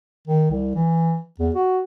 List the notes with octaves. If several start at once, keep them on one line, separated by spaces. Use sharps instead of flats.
D#3
C2
E3
E2
F#4